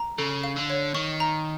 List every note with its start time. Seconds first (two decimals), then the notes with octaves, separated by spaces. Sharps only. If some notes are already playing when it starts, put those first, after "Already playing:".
Already playing: A#5
0.18 C#3 A4
0.44 F5
0.56 D3
0.70 C#5
0.94 D#3 C#6
1.20 A#5